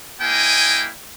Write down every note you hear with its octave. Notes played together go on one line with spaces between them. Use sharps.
A#3 E4 D#5 G5 G#5